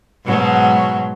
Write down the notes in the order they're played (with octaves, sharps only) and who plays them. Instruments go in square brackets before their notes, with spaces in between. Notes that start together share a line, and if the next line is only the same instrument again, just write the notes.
[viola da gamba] G#2 B2 F#3